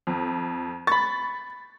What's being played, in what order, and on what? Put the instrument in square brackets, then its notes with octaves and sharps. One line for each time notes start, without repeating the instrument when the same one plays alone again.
[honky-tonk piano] F2
[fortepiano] B5 C#6 [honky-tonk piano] A6